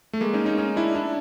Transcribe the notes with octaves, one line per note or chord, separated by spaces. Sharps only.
A3
G#3 A#3
C#4 D#4
C#4 D#4
C#4 D#4
D4 E4
D4 E4